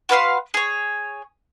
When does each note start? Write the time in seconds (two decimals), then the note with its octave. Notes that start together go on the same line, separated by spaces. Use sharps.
0.09 F#4 B4 F5 C6
0.54 G#4 C#5